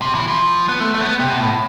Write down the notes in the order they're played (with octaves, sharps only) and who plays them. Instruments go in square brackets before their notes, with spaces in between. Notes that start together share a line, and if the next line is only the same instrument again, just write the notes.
[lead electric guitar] C3
E3
F3
B3
A3
A3
B3
C3
B2
A2